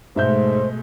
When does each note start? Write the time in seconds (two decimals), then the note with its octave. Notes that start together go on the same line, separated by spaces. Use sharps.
0.16 G#2 B2 G#3 A3 C5 E5 G6